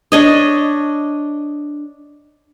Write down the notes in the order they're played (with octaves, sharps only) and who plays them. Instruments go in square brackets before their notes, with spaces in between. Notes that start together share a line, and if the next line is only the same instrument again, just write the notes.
[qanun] D4 C#5 D#5